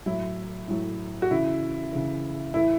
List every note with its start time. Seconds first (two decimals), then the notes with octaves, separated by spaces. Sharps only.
0.06 A2 F#3 E4
0.68 A2 F#3
1.22 F#4
1.31 C#3 E3 E4
1.93 C#3 E3
2.54 A2 E3 E4